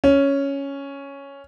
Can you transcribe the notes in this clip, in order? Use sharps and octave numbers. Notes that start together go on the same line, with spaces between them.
C#4